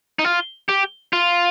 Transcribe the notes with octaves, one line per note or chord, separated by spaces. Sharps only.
D#4
F4
G4
F4